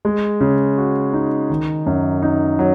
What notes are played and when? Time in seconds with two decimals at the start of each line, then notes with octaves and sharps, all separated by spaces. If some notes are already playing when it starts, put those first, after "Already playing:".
0.05 G#3
0.41 C#3
0.77 F#4
1.13 D#4
1.50 D#3
1.86 F#2
2.22 D#4
2.59 F#3